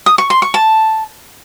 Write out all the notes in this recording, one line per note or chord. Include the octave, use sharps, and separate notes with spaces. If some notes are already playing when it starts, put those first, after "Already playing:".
D#6
C#6
C6
C#6
A5